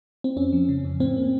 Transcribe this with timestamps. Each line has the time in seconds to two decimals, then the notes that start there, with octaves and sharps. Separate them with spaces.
0.24 C4
0.37 F2 C#4
0.53 F3
0.68 C#3
0.84 F2
1.00 A2 C4
1.16 A#3